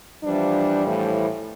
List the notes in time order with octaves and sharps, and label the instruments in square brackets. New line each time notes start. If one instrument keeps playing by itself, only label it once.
[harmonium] E3 F3 G3 [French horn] D4
[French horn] A2